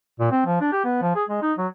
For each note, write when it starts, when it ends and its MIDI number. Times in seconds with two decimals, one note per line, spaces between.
0.20 0.31 46
0.31 0.43 60
0.46 0.60 53
0.61 0.69 62
0.72 0.85 67
0.85 0.98 59
1.02 1.11 53
1.15 1.24 68
1.29 1.42 56
1.43 1.53 63
1.58 1.67 54